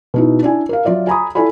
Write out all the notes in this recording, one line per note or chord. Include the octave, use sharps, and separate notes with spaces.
B2 D#4 E4
D4 E4 G#5
A#4 F5
F#3 F4 D5 E5
G#5 A#5 B5 D#6
E4 F4 A4 D5 G#5 B5